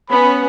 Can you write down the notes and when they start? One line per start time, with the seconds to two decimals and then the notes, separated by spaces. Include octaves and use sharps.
0.10 B3 C#4 B5